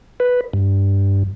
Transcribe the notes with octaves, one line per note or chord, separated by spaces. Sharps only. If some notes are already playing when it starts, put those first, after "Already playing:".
B4
G2